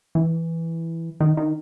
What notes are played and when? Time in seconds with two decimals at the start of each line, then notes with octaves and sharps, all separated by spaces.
0.15 E3
1.20 D#3
1.37 D#3